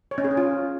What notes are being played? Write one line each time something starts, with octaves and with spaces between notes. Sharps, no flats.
C#5
C#4
G#4
C#4
F4